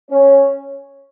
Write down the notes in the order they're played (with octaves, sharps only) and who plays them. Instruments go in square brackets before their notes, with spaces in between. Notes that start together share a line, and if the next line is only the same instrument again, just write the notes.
[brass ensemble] C#4 C#5